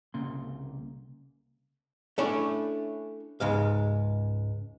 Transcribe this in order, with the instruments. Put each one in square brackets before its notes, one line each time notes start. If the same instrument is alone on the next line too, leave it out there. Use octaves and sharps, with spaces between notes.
[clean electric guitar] C2 C#3 A#3 C6
[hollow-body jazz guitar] A3 C#4 D4 E4 C#5
C#2 G#2 G#3 F5